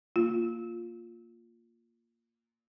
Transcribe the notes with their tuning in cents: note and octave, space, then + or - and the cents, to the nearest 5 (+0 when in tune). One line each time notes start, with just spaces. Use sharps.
A#3 -10 F4 +0